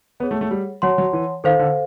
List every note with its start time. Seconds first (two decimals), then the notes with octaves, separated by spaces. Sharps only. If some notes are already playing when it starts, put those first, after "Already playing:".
0.20 B3 G#4 C#5 F#5
0.31 A3
0.41 A3
0.51 G3
0.82 F#3 C#5 F#5 A5 C6
0.98 F#3
1.13 E3
1.44 D#3 A4 C5 F5
1.59 D3